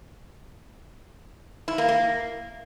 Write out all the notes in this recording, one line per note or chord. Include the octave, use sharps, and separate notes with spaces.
E4
A#3
A#3